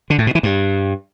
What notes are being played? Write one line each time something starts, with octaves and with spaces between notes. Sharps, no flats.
D3
A2
B2
E3
G2